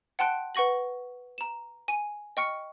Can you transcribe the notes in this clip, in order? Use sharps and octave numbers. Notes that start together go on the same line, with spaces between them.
F#5 G5 A5 C6 F#6 D7
B4 F#5 C#6 A#6 F#7
A#5 E7
G#5 D#7
D#5 G5 C#6 F6 C#7